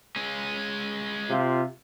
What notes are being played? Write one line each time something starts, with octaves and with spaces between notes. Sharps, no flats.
G#3 C#4
C3 F4